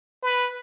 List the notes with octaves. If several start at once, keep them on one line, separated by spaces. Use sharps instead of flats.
B4